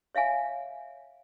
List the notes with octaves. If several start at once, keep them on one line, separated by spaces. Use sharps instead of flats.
C#5 E5 F5 G#5